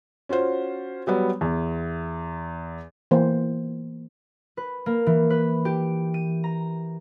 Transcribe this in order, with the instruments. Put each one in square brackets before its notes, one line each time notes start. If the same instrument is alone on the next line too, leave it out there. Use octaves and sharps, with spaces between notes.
[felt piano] C#4 F4 F#4 C5
F#3 G3 B3
E2
[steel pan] E3 A#3 C5
[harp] B4
A#3
E3
B4
G4
D#7
A#5